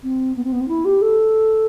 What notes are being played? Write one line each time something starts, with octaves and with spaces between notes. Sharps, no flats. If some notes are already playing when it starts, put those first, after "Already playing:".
C4
B3
C4
B3
C4
E4
G4
A4